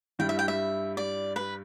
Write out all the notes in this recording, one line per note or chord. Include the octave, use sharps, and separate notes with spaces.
G2 G3 E4 G5
E5
G5
E5
D5
B4